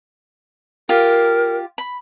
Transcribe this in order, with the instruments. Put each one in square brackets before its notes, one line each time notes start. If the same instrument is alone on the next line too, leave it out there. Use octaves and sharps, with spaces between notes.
[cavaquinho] F4 G4 [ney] A#4
[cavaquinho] B5